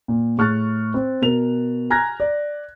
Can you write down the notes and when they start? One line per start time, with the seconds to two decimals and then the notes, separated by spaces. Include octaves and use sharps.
0.08 A#2
0.37 A2 G#4 C#6 F6 F#6 A6
0.94 C4
1.22 B2 A#4 F7
1.90 G#5 A#5 F6 F#6 G#6 A#6
2.20 D5